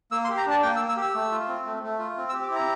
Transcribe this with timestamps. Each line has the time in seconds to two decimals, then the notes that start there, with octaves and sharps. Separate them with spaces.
0.11 A#3 E6
0.25 C6
0.29 G4
0.37 A#5
0.46 D4 A5
0.63 A#3 G5
0.76 E6
0.80 A#3
0.89 E6
0.97 G4
1.02 E6
1.14 A3
1.32 F4
1.48 C4
1.66 A3
1.83 A3
1.99 F4
2.17 C4
2.29 E6
2.34 G4
2.43 D6
2.50 E4
2.55 A#5